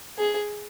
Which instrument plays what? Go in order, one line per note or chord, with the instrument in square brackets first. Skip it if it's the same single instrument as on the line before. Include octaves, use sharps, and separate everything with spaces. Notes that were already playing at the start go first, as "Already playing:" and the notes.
[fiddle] G#4